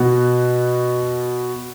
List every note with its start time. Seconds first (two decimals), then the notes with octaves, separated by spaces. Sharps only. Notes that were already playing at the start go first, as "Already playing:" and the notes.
Already playing: B2 F#4